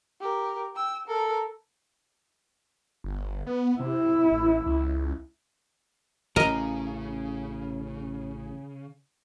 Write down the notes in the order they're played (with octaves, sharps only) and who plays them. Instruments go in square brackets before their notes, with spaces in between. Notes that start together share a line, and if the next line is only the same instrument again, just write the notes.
[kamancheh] G4 A#4
G5 E6
A4 A#4
[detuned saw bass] G1
B3
[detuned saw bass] C3 [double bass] E4
[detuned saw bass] A1
C#2
[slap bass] A1 [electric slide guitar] C#3 [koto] A#4 D#5 A#5